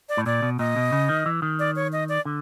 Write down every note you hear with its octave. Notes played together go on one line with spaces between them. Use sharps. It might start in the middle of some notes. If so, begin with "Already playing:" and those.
D5
A2
A#2 D5
B2
A#2 D#5
B2
C#3
D#3
E3
D#3
D5
C#5
D#5
D5
D3